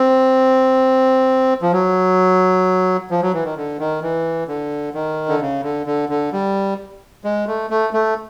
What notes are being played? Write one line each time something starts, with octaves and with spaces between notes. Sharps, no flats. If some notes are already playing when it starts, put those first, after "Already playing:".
Already playing: C4
F3
F#3
F3
F#3
E3
D#3
D3
D#3
E3
D3
D#3
D3
C#3
D3
D3
D3
G3
G#3
A3
A3
A3